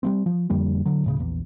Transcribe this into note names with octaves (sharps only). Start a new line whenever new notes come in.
G3 A3 C4
F3
F2 D3 G3 A#3
D3 F#3
D1 A2 C#3
A#1 E2